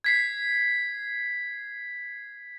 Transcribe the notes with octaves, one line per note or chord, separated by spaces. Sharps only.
G#6 B6 C7